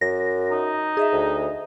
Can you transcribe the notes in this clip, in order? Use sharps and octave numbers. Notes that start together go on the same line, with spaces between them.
F#2 A#6
D#4
G#4 D#5 E5
D2